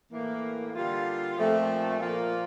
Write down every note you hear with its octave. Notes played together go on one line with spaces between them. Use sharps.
A2 E3 A#3
D3 G3 A#3 F4
A#2 F3 A3 C4
A#2 F3 A#3 F4